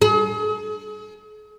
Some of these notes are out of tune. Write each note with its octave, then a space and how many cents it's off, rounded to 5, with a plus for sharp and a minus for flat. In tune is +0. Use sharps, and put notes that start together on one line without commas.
G#4 +40